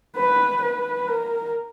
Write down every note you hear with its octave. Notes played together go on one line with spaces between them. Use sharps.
B4
B4
A#4